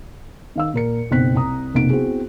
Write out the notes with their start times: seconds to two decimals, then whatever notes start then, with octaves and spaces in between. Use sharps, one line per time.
0.56 D#3 F5 E6
0.74 A#2 A#4 C#7
1.11 F#1 B1 B2 C4 F#6 B6
1.35 C2 C3 A#5 D#6
1.74 F1 B1 C3 A#3 C4 D7
1.90 B3 C4 E4 F#4 G#4